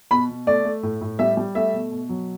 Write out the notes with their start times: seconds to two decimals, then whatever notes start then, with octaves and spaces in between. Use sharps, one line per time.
0.11 B2 B5
0.29 B2
0.47 A3 D5
0.65 A3
0.83 A2
1.01 A2
1.19 G3 E5
1.37 G3
1.55 A3 E5
1.74 B2
1.92 B2
2.09 F#3